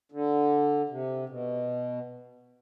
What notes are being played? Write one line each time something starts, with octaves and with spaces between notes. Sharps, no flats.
D3
C3
B2